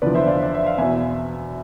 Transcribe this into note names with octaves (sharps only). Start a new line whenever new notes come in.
E2 D3 F3 B4 D5
C5 E5
D5 F5
D5
E5
F5
E2 B2 E5 G#5